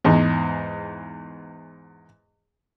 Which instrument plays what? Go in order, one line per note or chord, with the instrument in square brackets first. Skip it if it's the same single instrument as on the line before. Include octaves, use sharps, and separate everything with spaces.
[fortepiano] E2 G#2